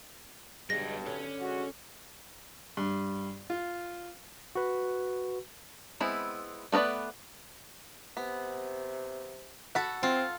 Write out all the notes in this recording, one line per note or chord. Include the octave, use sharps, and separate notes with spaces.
B1 G2 G3 G#3 B3 A#6
D3 C#4
G#3 F#4
G2
F4
F#4 B4
G#3 B3 C4 E4
A3 B3 A#4 B4 D5
C3 B3
F#4 A4 F#5 B5
C4 F4